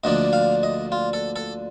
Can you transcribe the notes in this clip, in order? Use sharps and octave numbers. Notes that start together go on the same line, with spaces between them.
D2 D3 F3 A#3 D4 D#5
F5
D#5
F4
A4
A4